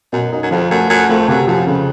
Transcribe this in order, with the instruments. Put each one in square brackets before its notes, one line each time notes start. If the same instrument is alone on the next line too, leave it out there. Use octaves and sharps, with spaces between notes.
[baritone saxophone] F#2 [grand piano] B2
[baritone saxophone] F#2 [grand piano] D#4
[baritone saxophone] F#2
[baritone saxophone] F2 [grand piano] F3
[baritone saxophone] F#2 [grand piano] A3
[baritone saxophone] F#2 [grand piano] A3
[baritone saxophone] F2 [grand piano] A3
[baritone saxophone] F#2 [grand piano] C3
[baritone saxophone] F#2 [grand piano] F3
[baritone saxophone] F2 [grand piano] C#3